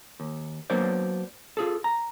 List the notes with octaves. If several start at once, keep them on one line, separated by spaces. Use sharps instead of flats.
D#2
F#3 A#3 B3 D4 C5 D5
F4 G#4 A4
A#5